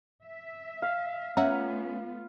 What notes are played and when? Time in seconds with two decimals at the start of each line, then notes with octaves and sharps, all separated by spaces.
0.23 E5
0.82 F5
1.37 A3 B3 C#4 F4 E5 F#5 A#5